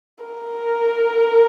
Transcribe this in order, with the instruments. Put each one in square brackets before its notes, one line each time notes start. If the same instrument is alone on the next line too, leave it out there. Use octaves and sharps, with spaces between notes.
[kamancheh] A#4